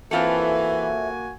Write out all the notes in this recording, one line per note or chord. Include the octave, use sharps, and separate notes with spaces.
E3 A#3 C4 F4 F#4 A4 E5 G#5